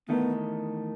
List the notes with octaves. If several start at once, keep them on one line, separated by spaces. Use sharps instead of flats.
E2 D#3 A3 B3 D#4